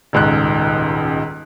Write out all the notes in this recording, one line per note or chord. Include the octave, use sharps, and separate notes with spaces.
D#1 C#2 G#2 F#6